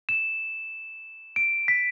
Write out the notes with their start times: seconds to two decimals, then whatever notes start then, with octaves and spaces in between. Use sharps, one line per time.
0.09 E7
1.36 D7
1.68 B6